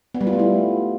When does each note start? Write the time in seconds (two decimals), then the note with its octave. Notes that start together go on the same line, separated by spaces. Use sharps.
0.14 B3
0.21 G3
0.27 F4
0.33 A3
0.39 E4